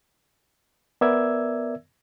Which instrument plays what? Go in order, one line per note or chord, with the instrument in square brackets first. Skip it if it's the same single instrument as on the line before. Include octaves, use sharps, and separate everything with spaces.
[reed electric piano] B3 A#4 D5 E5 E6 G#6